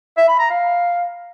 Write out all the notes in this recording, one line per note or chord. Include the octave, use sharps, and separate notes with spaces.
E5
B5
A#5
F5